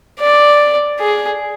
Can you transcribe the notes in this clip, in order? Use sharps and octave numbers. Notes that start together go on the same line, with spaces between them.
D5
G#4